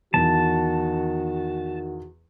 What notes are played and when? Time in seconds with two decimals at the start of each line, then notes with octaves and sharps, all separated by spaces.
0.14 E2 D#3 F#4 A5